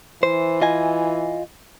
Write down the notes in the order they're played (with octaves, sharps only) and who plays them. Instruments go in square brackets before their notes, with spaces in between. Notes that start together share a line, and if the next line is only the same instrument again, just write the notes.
[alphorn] E3 [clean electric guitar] C5
[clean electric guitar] F4 D#5 G#5